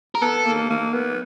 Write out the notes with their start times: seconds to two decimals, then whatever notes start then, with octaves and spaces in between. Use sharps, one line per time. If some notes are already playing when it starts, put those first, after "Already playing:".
0.15 A#4
0.22 B3 A4
0.45 A#3
0.70 A#3
0.93 B3